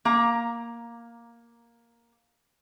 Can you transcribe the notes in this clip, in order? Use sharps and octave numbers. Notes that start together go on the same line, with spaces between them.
A#3 A#5